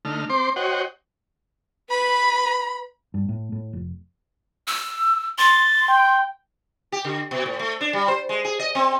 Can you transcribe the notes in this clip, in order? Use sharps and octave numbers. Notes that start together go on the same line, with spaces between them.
D3 A3 D#4 F6
C4 C5 C6 D6
F#4 C5 C#5 D#5 F#5 G5
B4 B5
G2
A2
A2
F1
E6
C6 A6
G5
G4
D3
B2
A2
A3
D4
G3
C5
G#3
G#4
D#5
C4